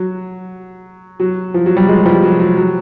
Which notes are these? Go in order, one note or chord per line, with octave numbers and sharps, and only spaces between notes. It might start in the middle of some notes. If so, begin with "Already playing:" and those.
Already playing: F#3
F#3
F3
F#3
G3
F#3 G#3
F3 G3
F#3
F#3
F#3